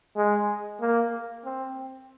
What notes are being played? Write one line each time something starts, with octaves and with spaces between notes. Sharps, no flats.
G#3
A#3
C4